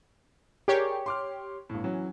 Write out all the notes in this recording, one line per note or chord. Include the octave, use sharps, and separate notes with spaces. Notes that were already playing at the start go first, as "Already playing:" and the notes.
G4 G#4 A#4 C#5 D5
C6 D6 F6
G1 A2
E3 F#3 C#4